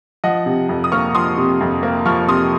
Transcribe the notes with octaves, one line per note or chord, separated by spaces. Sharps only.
F3 D#5 F#5
C3
F2
D#6
A#3 C#6 F6
F3 C6 D#6
C3
F2
A#3
F3 C#6 F6
C3 C6 D#6